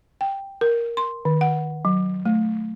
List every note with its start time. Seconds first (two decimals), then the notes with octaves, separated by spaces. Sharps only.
0.21 G5
0.61 A#4
0.97 C6
1.25 D#3
1.41 F#5
1.85 F#3
2.25 A3